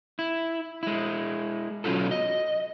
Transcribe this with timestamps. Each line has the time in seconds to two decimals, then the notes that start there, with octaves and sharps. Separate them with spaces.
0.19 E4
0.83 G#3 E4
1.84 B2 F#3 C#4 F4 F#4 A4
2.11 D#5